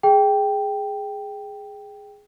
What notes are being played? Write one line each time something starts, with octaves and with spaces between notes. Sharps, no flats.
G#4 G5